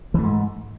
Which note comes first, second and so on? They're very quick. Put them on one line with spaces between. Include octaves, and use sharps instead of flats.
E3 A3 G#2